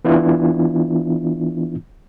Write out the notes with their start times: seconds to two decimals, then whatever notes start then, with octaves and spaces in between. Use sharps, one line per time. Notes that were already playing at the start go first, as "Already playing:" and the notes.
0.05 E3 B3 D4 E4 F4